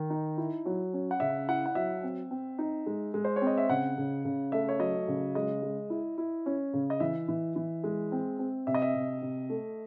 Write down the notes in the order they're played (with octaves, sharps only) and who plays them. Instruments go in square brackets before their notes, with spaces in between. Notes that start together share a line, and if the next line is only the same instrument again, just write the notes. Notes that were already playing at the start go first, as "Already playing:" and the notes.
Already playing: [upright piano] D#3
D#4
E4
F#3
C#4
[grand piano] F#5
[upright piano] C#3 [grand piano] E5
[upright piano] E4 [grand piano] F#5
[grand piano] F#5
[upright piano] F#3 [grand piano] E5
[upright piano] C4
C4
D#4
G#3
G#3
[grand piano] C5
C#5
[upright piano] C4
[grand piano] D#5
E5
[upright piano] C#3 [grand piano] F#5
[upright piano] C#3
C#3
[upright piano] A3 [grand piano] E5
[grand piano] C#5
[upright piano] F#3 [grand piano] D#5
[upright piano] C#3
[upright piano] G#3 [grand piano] D#5
[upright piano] G#3
E4
E4
C#4
C#3
[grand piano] D#5
[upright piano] E3 [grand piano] E5
[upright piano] E3
E3
G#3
C4
C4
[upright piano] C3 [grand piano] E5
[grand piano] D#5
E5
[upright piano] C3
C3
A3